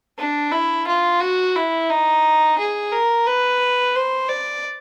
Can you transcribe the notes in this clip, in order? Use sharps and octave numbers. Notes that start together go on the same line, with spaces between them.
D4
E4
F4
F#4
E4
D#4
G#4
A#4
B4
C5
D5